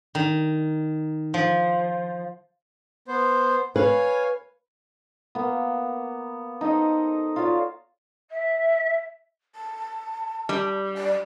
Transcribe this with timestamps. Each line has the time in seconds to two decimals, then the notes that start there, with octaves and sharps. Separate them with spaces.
0.15 D#3
1.34 F3
3.08 B3 C5
3.76 B4 C#5 F5 G#5
5.35 A#3 B3
6.61 D#4 A4 C5 D#5
7.36 F4 F#4 C#5 D5
8.30 E5
9.55 A5
10.49 G3
10.97 D5